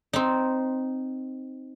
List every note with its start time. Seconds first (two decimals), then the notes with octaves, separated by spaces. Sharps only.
0.13 C4 D#4